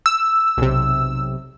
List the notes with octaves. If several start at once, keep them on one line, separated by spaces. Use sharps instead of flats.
E6
B1 C3